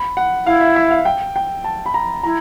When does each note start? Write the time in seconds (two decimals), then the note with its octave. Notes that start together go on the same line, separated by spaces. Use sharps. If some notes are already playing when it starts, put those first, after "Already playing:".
Already playing: B5
0.17 F#5
0.46 E4 F5
0.61 E5
0.76 E5
0.91 F5
1.05 G5
1.36 G5
1.64 A5
1.86 B5
1.94 A#5
2.23 E4 A#5